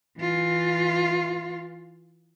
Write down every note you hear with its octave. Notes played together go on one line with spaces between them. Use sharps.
E3 F4